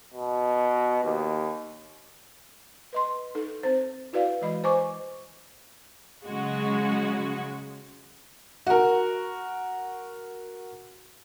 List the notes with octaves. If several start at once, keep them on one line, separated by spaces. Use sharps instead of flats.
B2
D#2
B4 D#5 C6
D#4 A4
C4 C5
E4 F#4 B4 D5 F5
E3 G#3 D#5 B5
C5 D#5 G#5 C#6 D6
C#3 F#3 G#3 F#4
F#4 A#4